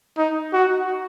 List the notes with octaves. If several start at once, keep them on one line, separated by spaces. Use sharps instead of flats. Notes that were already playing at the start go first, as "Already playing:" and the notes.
D#4
F#4